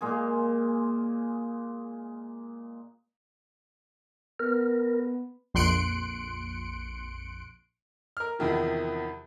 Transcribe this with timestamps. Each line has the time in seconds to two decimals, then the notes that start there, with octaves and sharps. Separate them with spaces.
0.01 A#2 G#3 A#3 G#4
4.40 B3 A#4
5.54 A#1 F2 C6 F#6 C#7 D7
8.17 A#4 F6
8.39 E2 C3 D#3 F3